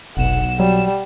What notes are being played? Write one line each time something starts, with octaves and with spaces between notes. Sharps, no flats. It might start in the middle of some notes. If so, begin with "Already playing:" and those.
F1 B1 F#5 E7
F#3 G3